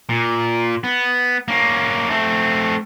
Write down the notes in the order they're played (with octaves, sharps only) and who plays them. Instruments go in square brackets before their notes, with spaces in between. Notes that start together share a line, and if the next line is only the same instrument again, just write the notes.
[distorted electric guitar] A#2
B3
A#3 C#4
A3 C4